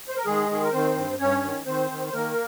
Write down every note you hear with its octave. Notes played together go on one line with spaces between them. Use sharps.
C5
A#4
D#3 G#3 G#4
D#3 G#4
A#4
D#3 C4 C5
G2
G2 C#4 C#5
D#3
D#3 C4 C5
D#3
C5
D#3 A#3 A#4